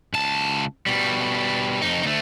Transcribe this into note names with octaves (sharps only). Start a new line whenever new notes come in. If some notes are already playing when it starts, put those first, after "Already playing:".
C#2 A5
B2 G3
F2 D#4
D2 A3